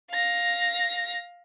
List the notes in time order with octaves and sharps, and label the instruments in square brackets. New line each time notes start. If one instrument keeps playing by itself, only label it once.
[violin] F5 A#6